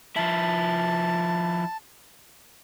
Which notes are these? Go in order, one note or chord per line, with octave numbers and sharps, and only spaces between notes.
F3 E4 A5